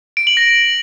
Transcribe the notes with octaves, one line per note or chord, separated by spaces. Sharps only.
D7
F#7
A#6